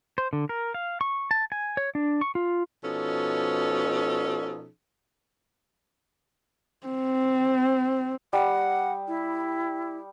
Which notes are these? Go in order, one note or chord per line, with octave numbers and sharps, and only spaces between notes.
C5
D3
A#4
F5
C#6
A5
G#5
C#5
D4
C#6
F4
B2 F3 C#4 D#4 A4
C4
G3 F#5 D#6
E4